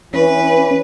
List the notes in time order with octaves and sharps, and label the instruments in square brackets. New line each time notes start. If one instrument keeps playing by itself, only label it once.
[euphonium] E3 [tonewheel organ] C#4 [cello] B4